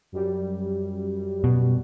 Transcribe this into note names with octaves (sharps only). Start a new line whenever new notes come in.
F#2 G3
B2